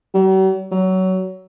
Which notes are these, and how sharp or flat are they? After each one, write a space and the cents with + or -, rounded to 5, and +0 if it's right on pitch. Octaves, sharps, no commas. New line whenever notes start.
F#3 +45
F#3 +20